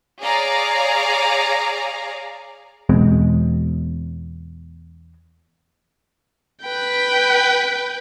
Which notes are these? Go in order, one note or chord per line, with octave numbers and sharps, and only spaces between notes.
G#4 C#5 D5 F5 A#5
E2 B2 G#3 C4
B4 G5